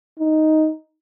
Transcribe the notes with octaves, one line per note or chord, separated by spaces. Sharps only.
D#4